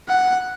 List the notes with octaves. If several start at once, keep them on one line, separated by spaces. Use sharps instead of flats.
F#5